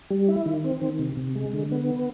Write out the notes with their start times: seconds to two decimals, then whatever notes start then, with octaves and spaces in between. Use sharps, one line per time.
0.11 G3
0.28 E4
0.46 D#3
0.64 C4
0.81 D#3
0.99 C3
1.17 C3
1.35 G#3
1.53 D3
1.72 B3